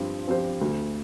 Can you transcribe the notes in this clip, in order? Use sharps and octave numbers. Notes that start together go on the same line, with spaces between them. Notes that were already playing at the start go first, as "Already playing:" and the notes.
Already playing: G2 F3 C4
F3 C4 G4 C5
D2